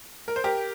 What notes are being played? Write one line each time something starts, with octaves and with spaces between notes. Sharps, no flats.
A#4
C5
G4 A#4